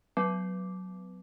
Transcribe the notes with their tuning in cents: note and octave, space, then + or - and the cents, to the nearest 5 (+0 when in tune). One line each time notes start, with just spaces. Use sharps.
F#3 +0 B3 +25